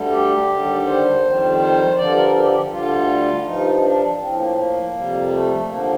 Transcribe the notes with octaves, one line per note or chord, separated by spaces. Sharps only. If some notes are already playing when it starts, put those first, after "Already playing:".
Already playing: D2 D3 G3
G4
D#2 D3 G3
C5
F2 D#3 G3
C5
G2 D3 F3 D5
A#4
A4
G4
G4
D2 D3 G3 F4
G2 F3 D#4
D4
A2 F3 C4
A#3
A#3
F2 C3 G3
A3
D#2 D3 F3 A#3